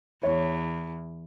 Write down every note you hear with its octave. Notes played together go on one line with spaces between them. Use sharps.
E2 C#5